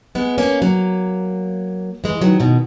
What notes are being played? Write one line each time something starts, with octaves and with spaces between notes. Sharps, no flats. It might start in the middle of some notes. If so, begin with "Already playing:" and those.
G#3 B3
A#3 C#4
F#3 A#3
E3 G#3
D#3 F#3
B2 D#3